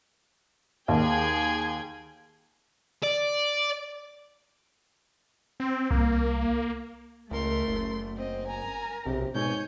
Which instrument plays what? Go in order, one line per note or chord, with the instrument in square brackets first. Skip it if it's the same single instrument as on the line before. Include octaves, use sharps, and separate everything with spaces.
[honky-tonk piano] D#2 [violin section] G#4 G5 G#6
[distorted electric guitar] D5
[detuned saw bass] C4
[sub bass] C2 [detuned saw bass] A#3
[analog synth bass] C#2 [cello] A3 [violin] A#4 C6
[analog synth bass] F#1
[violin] C4 D#5
[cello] A#4 [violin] G#5 A#5
[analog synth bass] B1 [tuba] C3 [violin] G4
[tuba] G#2 [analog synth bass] B2 [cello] C#5 [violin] G#5 G6